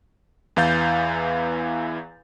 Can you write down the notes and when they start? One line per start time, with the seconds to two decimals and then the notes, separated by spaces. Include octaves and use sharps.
0.56 E2 E3 F5 G6 A6